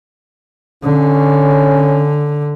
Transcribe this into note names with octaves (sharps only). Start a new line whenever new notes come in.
D3 C#4